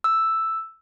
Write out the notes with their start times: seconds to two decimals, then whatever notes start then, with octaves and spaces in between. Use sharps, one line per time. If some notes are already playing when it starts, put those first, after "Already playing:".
0.04 E6